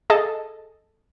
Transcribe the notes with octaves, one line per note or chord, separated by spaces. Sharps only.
G#4 A4 D#5 A5